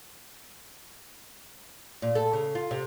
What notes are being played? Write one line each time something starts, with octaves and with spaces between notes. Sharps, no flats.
A#2
A4
C#3
F4
C3